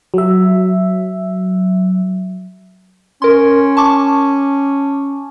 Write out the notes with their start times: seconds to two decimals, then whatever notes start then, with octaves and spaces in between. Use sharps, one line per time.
0.14 F#3 E5
3.22 C#4 A#4 C6
3.77 A5 C#6 D6